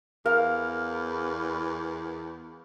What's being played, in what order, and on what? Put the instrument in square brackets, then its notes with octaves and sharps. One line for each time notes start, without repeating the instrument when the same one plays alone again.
[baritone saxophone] E2 [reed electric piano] A#4 [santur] F5